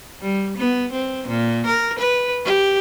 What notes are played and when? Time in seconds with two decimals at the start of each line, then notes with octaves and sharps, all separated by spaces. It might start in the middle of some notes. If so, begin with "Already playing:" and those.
0.21 G3
0.57 B3
0.92 C4
1.28 A#2
1.66 A#4
1.99 B4
2.45 G4